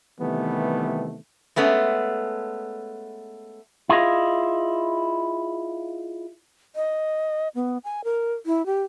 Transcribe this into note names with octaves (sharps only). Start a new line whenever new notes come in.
C3 D#3 E3 G3 A3 B3
G#3 A3 B3 C#4
E4 F4 G#4 D#5 F5
D#5
B3
G#5
A#4
E4
G4